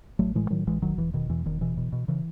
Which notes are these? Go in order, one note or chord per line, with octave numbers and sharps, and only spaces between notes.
A1 F#3 A3
A2 E3 G#3
A2 D#3 F#3
A1 E3 G#3
E1 D#3 F#3
E1 E3
B2 D#3
E2 E3
E1 D#3
B2 E3
B2
B2
C#3 E3